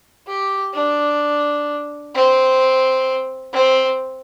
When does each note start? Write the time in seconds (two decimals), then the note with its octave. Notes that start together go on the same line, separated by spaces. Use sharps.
0.27 G4
0.74 D4
2.15 C4
3.54 C4